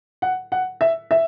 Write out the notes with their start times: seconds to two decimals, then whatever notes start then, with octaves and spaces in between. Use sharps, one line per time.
0.22 F#5
0.52 F#5
0.81 E5
1.11 E5